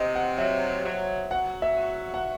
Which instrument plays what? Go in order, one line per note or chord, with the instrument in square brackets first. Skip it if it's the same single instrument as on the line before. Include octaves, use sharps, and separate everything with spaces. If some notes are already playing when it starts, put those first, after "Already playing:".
Already playing: [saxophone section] C3 [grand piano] C5 D#5
[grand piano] F#5
[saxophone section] F#3 [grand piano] E5
[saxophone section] F#3
[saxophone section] F#3 [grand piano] F#5
[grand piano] E5
[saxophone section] F#4
[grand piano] F#5